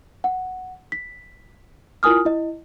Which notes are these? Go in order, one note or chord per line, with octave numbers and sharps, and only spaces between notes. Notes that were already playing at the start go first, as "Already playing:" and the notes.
F#5
B6
E4 F4 A#4 G#5 D#6 F6
E4 D#5